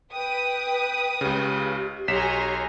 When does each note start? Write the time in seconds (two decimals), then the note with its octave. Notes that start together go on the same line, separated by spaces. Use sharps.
0.13 B4 G5 D#6
1.21 C#2 C#3 G4
2.08 B1 C#5 G#5 A#5 C6 B6 E7